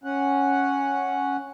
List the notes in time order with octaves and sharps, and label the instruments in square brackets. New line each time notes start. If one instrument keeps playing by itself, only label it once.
[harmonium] C#4 F#5